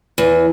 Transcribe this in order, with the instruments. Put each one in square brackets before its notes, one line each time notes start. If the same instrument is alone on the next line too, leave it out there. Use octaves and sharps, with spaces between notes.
[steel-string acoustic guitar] E2